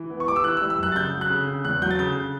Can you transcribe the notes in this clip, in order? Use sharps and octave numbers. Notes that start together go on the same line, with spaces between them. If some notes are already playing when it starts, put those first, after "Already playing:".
Already playing: E3
B3
C#6
G3 D6
E6
E3 F#6
E6
G3
E6
F#2 F#6
A6
C#3 G6
F#3
F#6
C#3
C#3
E2 F#6
F#3 G6
A6
C#3 G6
C#3